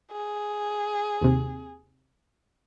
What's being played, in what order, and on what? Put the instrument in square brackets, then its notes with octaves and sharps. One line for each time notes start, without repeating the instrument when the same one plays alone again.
[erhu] G#4
[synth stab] D#2 C3